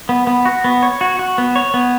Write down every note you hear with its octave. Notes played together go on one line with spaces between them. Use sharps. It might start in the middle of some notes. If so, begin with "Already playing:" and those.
B3
B3
F#4
B3
C#5
F#4
F#4
B3
C#5
B3